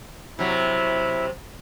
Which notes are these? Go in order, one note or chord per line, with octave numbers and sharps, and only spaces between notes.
C3 F#3 E4